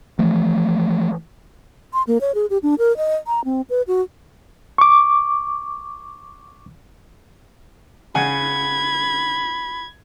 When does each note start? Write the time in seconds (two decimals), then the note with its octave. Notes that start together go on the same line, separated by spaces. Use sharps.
0.19 E3 F3 A3
1.92 C6
2.07 A#3
2.21 C#5
2.35 G#4
2.50 G4
2.63 D4
2.79 A#4
2.97 D#5
3.27 A#5
3.45 C4
3.70 B4
3.88 F#4
4.78 C#6 D6
8.15 C#3 F#5 G#5 B5 G#6